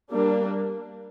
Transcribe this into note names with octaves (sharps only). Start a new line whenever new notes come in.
G3 A#3 D4